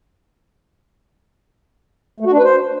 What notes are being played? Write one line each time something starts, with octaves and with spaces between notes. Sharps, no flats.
A3
F#4
D4
B4
C5